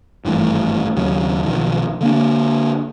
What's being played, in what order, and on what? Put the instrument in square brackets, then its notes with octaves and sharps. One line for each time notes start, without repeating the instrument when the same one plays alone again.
[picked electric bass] G#1 G2 E3 A3
D#2 C#3 F#3
B1 D#3 F3
D3 A#3 D4